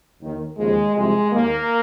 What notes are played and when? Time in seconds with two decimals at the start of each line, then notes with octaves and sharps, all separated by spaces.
0.21 D#2 D#3
0.58 D#2 C#3 F3 G#3
0.95 C2 C3 F3 G#3
1.32 D#2 D#3 A#3